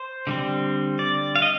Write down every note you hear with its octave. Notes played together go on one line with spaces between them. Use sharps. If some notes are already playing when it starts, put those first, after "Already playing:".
Already playing: C5
D3 G3 C4
D5
F5
D#5